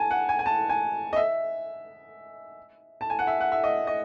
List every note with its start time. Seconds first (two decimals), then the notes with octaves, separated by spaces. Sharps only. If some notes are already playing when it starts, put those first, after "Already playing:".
Already playing: G#5 A5
0.11 F#5
0.29 G#5
0.39 G#5
0.46 A5
0.69 G#5
1.13 D#5
1.16 E5
3.01 A5
3.10 G#5
3.19 F#5
3.27 E5
3.40 F#5
3.52 E5
3.64 D#5
3.87 D#5